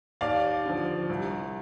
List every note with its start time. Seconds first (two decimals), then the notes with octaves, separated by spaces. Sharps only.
0.21 D#2 D5 F5
0.66 D3 F3
1.09 C2